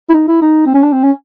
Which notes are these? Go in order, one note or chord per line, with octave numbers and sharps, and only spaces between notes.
E4
D#4
E4
D#4
C4
C#4
D4
C4
C#4